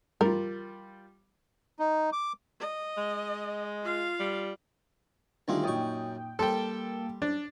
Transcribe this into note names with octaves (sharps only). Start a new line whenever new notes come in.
G3 F4 A#4
D#4
D6
D#5
G#3
F4 F5
G3
D2 D#3 G3 G#3 C4 D4 F4
F#2 A#2 D#4 G5 C#6 D#6
G3 A#3 A4 G5 C6
D4